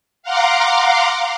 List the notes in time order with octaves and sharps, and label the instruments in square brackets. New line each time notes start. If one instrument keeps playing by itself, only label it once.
[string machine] F5 F#5 A#5 C6 D6